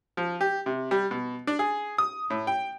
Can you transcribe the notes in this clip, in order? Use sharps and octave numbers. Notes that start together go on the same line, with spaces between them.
F3
G4
C3
G3
B2
D4
G#4
D#6
A2
G5